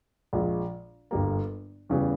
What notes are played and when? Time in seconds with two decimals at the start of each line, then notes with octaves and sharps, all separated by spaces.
0.33 A#1 A#2 G#3
1.11 G1 G2 G3 A#3
1.89 E2 C#3 E3 G3